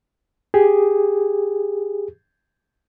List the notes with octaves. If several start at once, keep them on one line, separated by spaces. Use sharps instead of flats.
G4 G#4